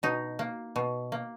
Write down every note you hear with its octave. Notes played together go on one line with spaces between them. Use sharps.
B2 D#4
A#3
B2
A#3